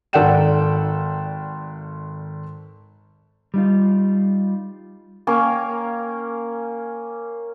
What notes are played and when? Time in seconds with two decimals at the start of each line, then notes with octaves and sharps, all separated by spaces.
0.13 G#1 A4 D5 F#5 G5 E7
3.54 G3 D#4 F4
5.27 A#3 C#4